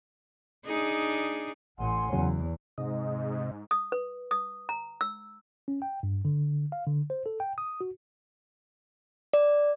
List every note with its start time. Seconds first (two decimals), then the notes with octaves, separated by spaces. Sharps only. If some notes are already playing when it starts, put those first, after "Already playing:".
0.66 D4 D#4 G#4
1.78 A1 F#5 G#5 C6
2.13 E2 C#3 F#3
2.78 G#2 C3 D#5
3.71 D#6
3.92 B4
4.31 D#6
4.69 A#5
5.01 E6
5.68 C#4
5.82 G5
6.03 G2
6.25 D3
6.72 F5
6.87 D3
7.10 C5
7.26 A4
7.40 G5
7.58 D#6
7.81 F#4
9.33 D5